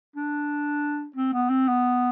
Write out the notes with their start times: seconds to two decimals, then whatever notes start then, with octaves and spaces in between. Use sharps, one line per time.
0.16 D4
1.16 C4
1.33 B3
1.50 C4
1.68 B3